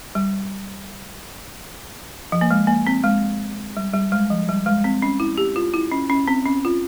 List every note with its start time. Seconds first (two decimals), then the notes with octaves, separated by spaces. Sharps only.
0.15 G3
2.32 F3
2.41 A#3
2.51 G#3
2.67 A#3
2.87 C4
3.04 G#3
3.77 G3
3.94 G3
4.12 G#3
4.30 F3
4.49 G3
4.66 G#3
4.84 C4
5.02 C#4
5.20 E4
5.37 G4
5.56 F4
5.74 E4
5.92 C#4
6.10 C#4
6.28 C4
6.46 C#4
6.65 F4